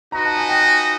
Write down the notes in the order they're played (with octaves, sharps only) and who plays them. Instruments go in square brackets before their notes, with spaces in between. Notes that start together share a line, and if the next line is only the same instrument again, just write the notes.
[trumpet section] D#4 F#4 B4 D#5 [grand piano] A#5
[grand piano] A5
G#5
G5
G#5